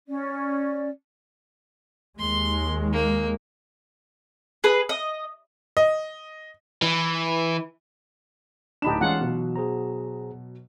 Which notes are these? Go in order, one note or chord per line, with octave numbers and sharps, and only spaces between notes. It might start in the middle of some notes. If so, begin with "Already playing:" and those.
C#4 D5
D#2 G#3 C6
A#3
G#4 B4
D#5
D#5
E3
D1 D4 D#4 G4 B5 E7
E3 G#3 C#4 F4 F#5
B2 F#3
G#4 C5 A#5